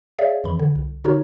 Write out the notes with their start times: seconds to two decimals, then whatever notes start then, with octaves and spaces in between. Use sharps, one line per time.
0.19 G#4 C#5 D5 E5 F5
0.44 F2 E3 B5
0.59 D3
0.76 C2
1.04 D3 D#4 F#4 A#4 C#5